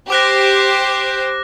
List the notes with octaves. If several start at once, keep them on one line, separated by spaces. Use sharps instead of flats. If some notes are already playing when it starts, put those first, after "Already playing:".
G4 C5 D6 F#6 A#6